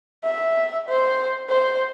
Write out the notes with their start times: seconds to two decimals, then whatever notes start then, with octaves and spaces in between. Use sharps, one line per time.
0.24 E5
0.89 C5
1.49 C5